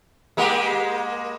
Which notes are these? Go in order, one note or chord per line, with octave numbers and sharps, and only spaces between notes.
G#3 A#3 G4